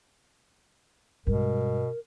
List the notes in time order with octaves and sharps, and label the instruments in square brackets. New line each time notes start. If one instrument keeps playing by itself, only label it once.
[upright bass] G2 G#3 [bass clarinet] B2 [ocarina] A#4